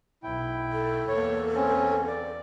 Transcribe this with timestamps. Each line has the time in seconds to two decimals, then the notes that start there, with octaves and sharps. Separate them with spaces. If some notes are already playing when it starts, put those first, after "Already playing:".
0.23 B1 E4 G5
0.73 A4
1.08 E2 A#3 C#5
1.55 C4 C#4
2.07 D5